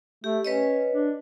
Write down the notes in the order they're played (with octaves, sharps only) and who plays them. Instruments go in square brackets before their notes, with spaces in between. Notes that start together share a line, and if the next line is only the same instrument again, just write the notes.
[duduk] A3 [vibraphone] G4
[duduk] C#4 [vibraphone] B4 C#5 D#5
[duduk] D4